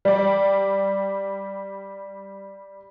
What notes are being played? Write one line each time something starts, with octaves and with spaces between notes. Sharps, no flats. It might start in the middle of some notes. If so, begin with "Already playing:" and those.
G3 D5